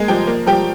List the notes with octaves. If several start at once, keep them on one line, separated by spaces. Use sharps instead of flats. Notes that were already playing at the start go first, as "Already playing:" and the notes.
Already playing: G#3 A#3 G#4
F3 G4 G5
A#3
F3 G4 G5